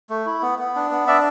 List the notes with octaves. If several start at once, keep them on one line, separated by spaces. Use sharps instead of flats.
A3
E4
B3
B3
D4
B3
D4 D5 E5